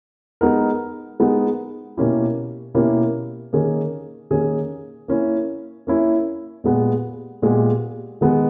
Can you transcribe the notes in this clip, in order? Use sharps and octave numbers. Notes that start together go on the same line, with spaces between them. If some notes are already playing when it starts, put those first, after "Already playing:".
G#3 B3 D#4 A#4
G#3 B3 D#4 A#4
B2 A#3 C#4 E4 G4
B2 A#3 C#4 E4 G4
D#3 A#3 C#4 G#4
D#3 A#3 C#4 G#4
A#3 C#4 E4
A#3 C#4 E4
A#2 G#3 B3 G4
A#2 G#3 B3 G4
D#3 G#3 B3